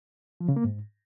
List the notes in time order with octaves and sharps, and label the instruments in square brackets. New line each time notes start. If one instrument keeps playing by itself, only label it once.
[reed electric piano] F3
C#3
A#3
G#2